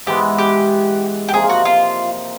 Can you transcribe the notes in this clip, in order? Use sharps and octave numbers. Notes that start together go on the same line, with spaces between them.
G#2 E3 G#3 B3 G4
G4
G4
C3 F3 A#3 D#4 G#4
F#4
F4